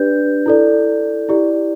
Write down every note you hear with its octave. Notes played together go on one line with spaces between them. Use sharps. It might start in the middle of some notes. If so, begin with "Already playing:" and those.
Already playing: D4 G4 B4 D5 G6
E4 A4 D5
E4 G4 D5